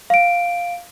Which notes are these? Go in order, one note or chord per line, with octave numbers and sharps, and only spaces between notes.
F5 D7